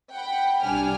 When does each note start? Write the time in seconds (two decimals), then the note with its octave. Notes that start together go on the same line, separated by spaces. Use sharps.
0.13 F#5 G5 B5
0.62 C2 G3 D4 G#5 F6